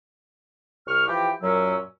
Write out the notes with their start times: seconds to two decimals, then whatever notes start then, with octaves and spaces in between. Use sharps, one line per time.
0.87 C2 C#6 F6
1.07 E3 F3 G4
1.42 F#2 A#2 F#3 C#4 E6